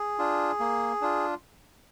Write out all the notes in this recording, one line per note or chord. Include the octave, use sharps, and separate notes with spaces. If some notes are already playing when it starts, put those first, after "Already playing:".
Already playing: G#4
D4 F4
A#3
D4 F4